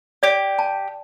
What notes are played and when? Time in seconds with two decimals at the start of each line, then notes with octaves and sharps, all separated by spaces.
0.23 G4 D5
0.59 A5